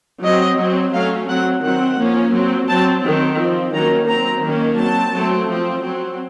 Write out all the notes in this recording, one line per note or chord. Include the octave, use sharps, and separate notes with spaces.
F#3 C4 D#5
F#3 C4
F#3 A3 C#4 F5
F#3 C4 F#5
D#3 F#3 C4 F#5
F3 A#3 C#4
F#3 C4
F#3 C4 A5
D#3 F#3 C4
F3 C4
D#3 F#3 A#3 C#4 A#5
F#3 C4 A#5
D#3 A#3 C#4
F#3 C4 A5
F#3 A3 C4
F3 C4
F#3 C4